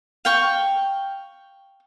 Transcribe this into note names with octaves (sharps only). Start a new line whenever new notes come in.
F5 G5 C#6